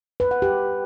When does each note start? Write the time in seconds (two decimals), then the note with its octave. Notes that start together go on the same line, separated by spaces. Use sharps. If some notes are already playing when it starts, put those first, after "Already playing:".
0.20 B4
0.31 F#5
0.42 G4